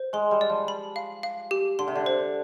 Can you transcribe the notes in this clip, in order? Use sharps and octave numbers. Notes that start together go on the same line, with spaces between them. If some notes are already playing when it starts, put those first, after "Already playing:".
Already playing: C5
G#3 C6
G3
D5
F3
B5
F5
F5
G4
D3 C6
C3
D3
C5